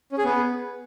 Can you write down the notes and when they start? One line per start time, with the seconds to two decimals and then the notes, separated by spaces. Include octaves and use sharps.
0.12 C#4
0.18 G#4
0.24 B3